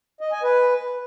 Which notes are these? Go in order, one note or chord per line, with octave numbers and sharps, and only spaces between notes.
D#5
G#5
B4